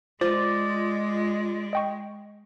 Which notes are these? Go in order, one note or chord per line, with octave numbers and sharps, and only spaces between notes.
G#3 F4 C5 D5
D#5 G5 C#6